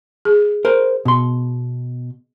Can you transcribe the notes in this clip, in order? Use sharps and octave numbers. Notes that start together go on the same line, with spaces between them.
G#4
A#4 C5
B2 C6